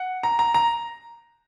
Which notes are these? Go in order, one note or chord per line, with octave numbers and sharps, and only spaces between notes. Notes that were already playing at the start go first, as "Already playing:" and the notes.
Already playing: F#5
A#5
A#5
A#5